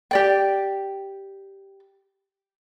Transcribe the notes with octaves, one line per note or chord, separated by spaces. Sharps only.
G4 D5 G5